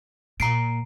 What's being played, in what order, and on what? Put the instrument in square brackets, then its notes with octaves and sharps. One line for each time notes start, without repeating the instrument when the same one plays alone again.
[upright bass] A#2 [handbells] A#5 C7 D7